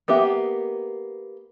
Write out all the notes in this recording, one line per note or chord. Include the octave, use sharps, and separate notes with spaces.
A#3 B3 G4 E5